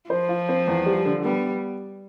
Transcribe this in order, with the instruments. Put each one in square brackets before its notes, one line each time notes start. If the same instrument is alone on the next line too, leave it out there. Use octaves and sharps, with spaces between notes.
[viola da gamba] F3 [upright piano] C5
[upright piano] F4
C4
E2
G3
D3
[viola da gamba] G3 [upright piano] B3